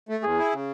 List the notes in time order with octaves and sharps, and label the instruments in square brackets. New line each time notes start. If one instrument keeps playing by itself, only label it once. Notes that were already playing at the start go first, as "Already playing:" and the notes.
[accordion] A3
[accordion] E2 [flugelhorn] G#4
[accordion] E4
C#3